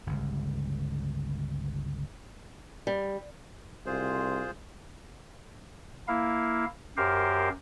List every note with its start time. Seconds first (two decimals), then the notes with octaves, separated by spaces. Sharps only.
0.07 G1 C#2
2.87 G3
3.86 C2 F4 G#4 C5
6.08 A#3 E4 F5
6.97 F#2 G4 A#4 C5 F5